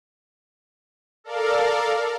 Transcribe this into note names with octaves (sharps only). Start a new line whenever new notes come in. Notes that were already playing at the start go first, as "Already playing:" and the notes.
A4 A#4 D5 F5